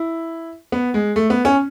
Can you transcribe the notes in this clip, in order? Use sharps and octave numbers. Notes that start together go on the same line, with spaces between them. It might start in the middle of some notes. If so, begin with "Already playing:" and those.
Already playing: E4
B3
G#3
A3
B3
C#4